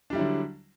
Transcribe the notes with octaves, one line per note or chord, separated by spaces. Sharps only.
D3 F#3 G3 D4 E4